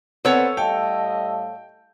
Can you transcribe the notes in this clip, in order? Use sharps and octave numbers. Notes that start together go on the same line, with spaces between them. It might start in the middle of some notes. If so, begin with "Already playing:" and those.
B3 C4 A4 C#5 F#5
A2 G3 D#5 F5 G5 A5 E6